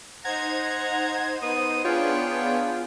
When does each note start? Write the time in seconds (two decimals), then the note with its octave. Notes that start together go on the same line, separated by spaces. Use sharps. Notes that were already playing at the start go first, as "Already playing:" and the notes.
0.25 D#4 C5 F#5 A#5 G#6
1.42 B3 D#6
1.85 B3 D4 F4 G#4 C#5 G5